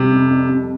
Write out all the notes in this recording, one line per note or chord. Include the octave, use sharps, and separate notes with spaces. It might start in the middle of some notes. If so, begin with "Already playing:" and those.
Already playing: C3 G3
F2
F2
F2